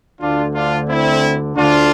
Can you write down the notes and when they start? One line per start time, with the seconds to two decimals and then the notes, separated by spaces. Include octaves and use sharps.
0.21 D2 D3 D4 F4
0.54 D4 F4
0.88 C4 E4
1.56 D2 D3 D4 F4